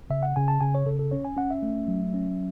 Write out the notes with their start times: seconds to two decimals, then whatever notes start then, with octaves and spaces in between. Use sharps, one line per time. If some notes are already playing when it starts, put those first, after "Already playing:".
0.10 C#3 E5
0.23 F#5
0.36 C#3 G#5
0.48 A5
0.61 C#3 G#5
0.75 C#5
0.86 C#3 A4
0.99 A4
1.11 C#4 C#5
1.25 G#5
1.37 C#4 F#5
1.51 E5
1.63 A3
1.88 F#3
2.14 C#4